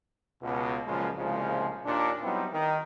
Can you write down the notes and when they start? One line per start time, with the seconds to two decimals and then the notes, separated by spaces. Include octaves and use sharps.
0.42 C#2 B2
0.87 C#2 F#2 A#2 C#3 F3 G#3
1.17 C2 A#2 C#3 F3 G#3
1.86 D#2 A#2 D4
2.23 F#3 G3 B3 C4 D#4 E4
2.52 D#3